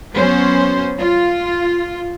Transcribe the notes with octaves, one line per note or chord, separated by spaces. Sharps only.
F#3 B3 C#4 C5
F4